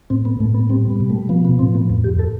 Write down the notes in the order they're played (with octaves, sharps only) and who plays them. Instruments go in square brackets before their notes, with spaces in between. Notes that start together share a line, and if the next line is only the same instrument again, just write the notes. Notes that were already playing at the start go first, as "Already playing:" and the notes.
[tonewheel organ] A2 C4
B3
A2 A3
B3
G3 C4
B3
B2
A3
F3 B3
B3
A2 C4
B3
F2
G4
A4